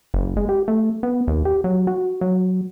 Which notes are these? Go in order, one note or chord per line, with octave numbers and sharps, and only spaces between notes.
F#1
G#3
G4
A3
B3
D#2
G4
F#3
F#4
F#3